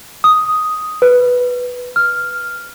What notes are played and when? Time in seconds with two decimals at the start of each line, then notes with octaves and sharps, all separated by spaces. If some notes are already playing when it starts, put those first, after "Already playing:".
0.24 D#6
1.02 B4
1.96 F6